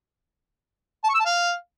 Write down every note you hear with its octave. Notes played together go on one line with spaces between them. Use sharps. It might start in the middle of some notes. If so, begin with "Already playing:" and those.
A5
C#6
E6
A5
F5